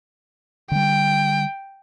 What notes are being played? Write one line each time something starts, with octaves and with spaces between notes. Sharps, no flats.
D3 G3 G5